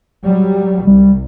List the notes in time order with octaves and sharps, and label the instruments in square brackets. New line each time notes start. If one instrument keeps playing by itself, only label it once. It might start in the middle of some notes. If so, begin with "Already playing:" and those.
[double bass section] F#3 G3
[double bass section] C2 [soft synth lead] G3